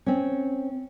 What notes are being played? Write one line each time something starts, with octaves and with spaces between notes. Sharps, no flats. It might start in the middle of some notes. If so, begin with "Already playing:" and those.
C4 C#4